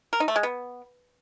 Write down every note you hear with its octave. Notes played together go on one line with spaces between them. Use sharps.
A#4
D#4
A3
G#3
B3